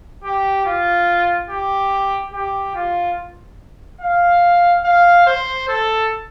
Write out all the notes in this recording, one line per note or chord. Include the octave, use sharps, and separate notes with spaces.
G4
F4
G4
G4
F4
F5
F5
C5
A4